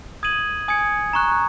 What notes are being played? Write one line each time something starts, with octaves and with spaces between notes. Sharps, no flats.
D#6 G#6 D#7 F#7
G#5 D#6 G#6 C#7
A#5 C#6 F#6